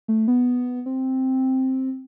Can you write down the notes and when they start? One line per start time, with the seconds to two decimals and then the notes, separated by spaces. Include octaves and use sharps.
0.08 A3
0.28 B3
0.86 C4